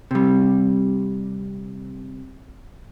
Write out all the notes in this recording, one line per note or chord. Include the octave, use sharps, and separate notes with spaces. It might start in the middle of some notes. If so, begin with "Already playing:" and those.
C3 G3